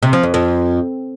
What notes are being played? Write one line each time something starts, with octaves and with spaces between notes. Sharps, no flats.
C3
F3
F2
F2